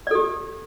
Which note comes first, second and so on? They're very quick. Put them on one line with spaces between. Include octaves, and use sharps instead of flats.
D5 A4 G4